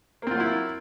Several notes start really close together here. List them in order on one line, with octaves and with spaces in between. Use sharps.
A#3 C4 F4 F#3 E4